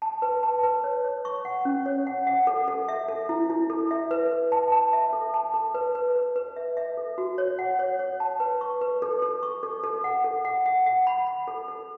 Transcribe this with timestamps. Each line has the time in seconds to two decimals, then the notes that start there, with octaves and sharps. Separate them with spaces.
0.02 A5
0.22 B4
0.43 A5
0.63 B4
0.84 C#5
1.04 C#5
1.25 C#6
1.45 F#5
1.65 C#4
1.86 C#5
2.07 F#5
2.27 F#5
2.47 A4
2.68 A4
2.89 E5
3.08 A4
3.29 E4
3.50 E4
3.70 A4
3.91 E5
4.11 B4
4.32 B4
4.52 A5
4.72 A5
4.93 E5
5.13 A4
5.34 A5
5.54 A4
5.74 B4
5.95 B4
6.16 B4
6.36 B4
6.56 E5
6.77 E5
6.97 A4
7.18 F#4
7.38 C#5
7.59 F#5
7.79 C#5
7.99 C#5
8.20 A5
8.40 B4
8.61 C#6
8.81 B4
9.02 A4
9.22 A4
9.43 C#6
9.63 A4
9.84 A4
10.04 F#5
10.24 A4
10.45 F#5
10.66 F#5
10.86 F#5
11.07 B5
11.27 B5
11.48 A4
11.68 A4